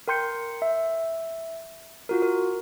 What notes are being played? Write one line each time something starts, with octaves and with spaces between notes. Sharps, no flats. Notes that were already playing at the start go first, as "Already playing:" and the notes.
A#4 G5 C6 G6 C#7
E5
F4 F#4 A#4
A#4